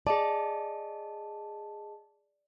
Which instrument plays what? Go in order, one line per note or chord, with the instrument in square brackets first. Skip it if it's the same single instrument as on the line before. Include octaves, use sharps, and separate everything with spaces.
[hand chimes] G#4 D#5 A5 [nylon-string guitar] D5